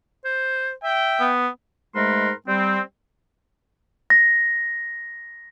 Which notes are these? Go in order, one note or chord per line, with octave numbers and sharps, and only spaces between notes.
C5
E5 G5
B3
G#2 G#3 A3 A#4 B4 C6
G3 C4
A#6